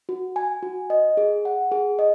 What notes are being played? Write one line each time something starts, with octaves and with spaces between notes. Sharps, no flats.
F#4
G#5
F#4
D#5
G#4
F#5
G#4
D#5